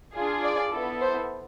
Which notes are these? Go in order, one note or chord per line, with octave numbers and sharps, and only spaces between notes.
D4 F4 G#4
D5
B3 E4 A4
C5